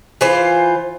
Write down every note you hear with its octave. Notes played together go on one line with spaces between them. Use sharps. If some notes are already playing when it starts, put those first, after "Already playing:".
E3 F4 C5